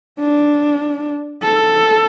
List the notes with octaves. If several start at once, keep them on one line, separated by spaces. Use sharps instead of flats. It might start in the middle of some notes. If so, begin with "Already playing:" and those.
D4
A4